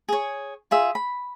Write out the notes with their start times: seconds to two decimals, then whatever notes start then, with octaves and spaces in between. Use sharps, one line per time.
0.09 G#4 C#5
0.71 F4 G#4 E5
0.95 B5